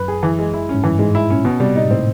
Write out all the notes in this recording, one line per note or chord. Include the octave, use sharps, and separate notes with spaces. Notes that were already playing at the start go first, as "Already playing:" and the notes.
Already playing: F#2 B4
G#4
E3
G#3
E4
C#4
G#2
G2 E3
G#2 G#3
E4
A#2 C#4
B2
C3 G3
A#2 D#4
G#2
A2 C4